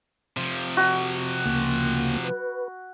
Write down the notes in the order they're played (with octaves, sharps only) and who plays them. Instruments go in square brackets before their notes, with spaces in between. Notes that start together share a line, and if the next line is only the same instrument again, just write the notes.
[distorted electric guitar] C3 F3
[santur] F#4
[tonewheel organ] D2 C#3 A#3
B4